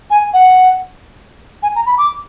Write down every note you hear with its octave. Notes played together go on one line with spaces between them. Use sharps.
G#5
F#5
G#5
A#5
B5
D6